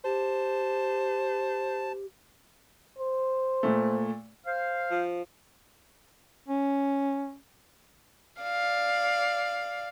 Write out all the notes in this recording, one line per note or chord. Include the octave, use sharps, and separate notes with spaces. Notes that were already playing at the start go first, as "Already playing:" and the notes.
G4 C5 A5
C5
A#2 A3
C5 F5
F3
C#4
D5 F5